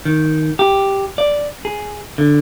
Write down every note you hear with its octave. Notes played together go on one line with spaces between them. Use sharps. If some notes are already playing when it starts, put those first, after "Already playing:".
D#3
G4
D5
G#4
D3